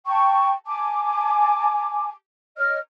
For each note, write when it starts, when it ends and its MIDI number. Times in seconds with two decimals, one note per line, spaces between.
0.06 0.53 79
0.06 0.53 81
0.06 0.53 85
0.66 2.11 80
0.66 2.11 81
0.66 2.11 86
2.57 2.78 73
2.57 2.78 75
2.57 2.78 89